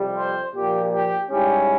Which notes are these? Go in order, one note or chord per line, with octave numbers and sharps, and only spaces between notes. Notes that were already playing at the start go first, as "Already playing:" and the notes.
Already playing: F2 C3 G3
C5
A#2 F3 A#3 G4
G4
G#2 G3 C#4 E4 G4